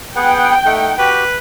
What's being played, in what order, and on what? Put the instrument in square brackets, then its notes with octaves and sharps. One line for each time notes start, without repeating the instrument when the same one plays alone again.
[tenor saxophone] B3 [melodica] G#4 B4 F#5 [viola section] G5
[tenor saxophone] A3 [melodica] D#4 F#5
[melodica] F#4 G4 [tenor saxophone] B4